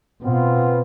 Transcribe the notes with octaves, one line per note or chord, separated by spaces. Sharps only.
B2 B3 C4 F4